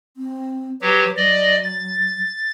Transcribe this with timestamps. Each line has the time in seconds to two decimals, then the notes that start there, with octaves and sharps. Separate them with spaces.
0.17 C4
0.82 F#3 G4 B4
1.17 F#3 D5 D#5
1.64 A6